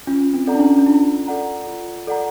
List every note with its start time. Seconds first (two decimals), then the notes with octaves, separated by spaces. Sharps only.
0.07 C#4 F4
0.33 C4
0.47 A4 D5 F#5 A#5
0.54 D4
0.60 C#4
0.78 C#4
0.86 D4 F4
1.27 A4 D5 F#5 A#5
1.67 F4
2.07 A4 D5 F#5 A#5